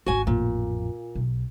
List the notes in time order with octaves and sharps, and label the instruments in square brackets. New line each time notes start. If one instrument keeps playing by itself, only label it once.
[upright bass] G#1 D2 [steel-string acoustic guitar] F#4 G#5
[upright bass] A1 F2 [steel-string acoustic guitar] A#2
[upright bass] B1